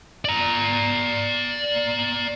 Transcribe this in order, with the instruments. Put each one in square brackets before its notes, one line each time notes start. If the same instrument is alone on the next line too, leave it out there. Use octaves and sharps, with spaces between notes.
[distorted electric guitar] D5 A#5